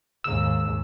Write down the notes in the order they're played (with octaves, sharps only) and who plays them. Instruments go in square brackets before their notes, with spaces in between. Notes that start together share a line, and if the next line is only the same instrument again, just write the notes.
[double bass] D#2 G#2 [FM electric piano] E6